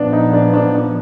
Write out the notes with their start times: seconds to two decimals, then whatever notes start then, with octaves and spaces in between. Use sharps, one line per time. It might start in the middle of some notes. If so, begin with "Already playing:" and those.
Already playing: A#2 F3 B3 D4
0.13 D#4
0.33 D4
0.54 D4
0.75 D4